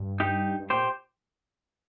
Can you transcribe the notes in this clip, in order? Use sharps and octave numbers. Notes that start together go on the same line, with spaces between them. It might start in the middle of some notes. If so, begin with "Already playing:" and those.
Already playing: G2
D#4 G4
G2
A#2 G4 C5